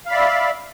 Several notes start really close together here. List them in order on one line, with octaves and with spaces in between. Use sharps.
F5 B5 D5 E5